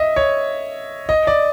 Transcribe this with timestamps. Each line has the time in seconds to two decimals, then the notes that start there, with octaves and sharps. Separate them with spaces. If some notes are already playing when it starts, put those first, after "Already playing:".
Already playing: D#5 E5
0.16 C#5
1.09 D#5
1.27 D5